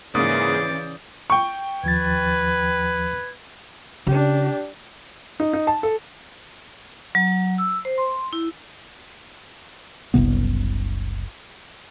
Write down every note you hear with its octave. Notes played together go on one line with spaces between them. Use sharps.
G#2 C#3 E3 A#3 G#4 D5 D#6
G6
G5 C#6
D#2 F3 B4 G#6 A6
C#3 D4 G4
D#4
D#4
A5
A4
F#3
E6
C5
C6
E4
F#1 C2 C3 B3